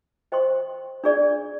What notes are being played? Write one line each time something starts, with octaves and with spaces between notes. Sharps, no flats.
C5 D#5 G5 C6
D4 G#4 D5